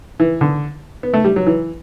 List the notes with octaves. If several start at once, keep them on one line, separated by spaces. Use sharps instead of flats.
E3
D3
B3
A3
G3
F#3
E3